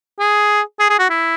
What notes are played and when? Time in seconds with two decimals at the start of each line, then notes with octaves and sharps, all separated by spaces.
0.20 G#4
0.79 G#4
0.90 G#4
0.99 F#4
1.10 E4